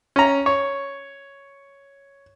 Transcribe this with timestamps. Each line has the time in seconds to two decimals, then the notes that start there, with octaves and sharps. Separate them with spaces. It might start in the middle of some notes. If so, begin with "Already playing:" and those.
0.16 C#4 A#5
0.46 C#5